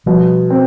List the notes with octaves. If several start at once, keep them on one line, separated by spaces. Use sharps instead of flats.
B2 F3 G3
C4